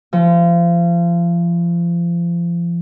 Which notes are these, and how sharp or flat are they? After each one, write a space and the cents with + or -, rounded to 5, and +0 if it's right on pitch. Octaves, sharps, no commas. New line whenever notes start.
F3 -30